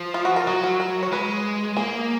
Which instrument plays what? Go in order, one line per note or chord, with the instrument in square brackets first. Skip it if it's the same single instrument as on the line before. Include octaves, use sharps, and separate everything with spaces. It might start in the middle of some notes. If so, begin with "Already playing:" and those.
Already playing: [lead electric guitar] F3
[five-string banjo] F4
F#4
A#4
[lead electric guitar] F#3 [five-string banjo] F#4
[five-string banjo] F#4
A#4
C#5
[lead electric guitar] G#3 [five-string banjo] B4
[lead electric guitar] A#3 [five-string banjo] G#4